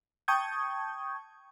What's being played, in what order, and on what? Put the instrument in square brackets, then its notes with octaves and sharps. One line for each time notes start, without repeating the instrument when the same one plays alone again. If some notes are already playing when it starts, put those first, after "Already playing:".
[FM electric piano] G5 A5 C#6 D#6 G6 G#6